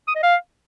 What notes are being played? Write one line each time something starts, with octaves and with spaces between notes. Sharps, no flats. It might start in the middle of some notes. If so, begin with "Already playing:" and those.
D#6
D#5
F5